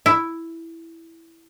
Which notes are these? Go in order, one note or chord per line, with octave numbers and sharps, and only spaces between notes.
E4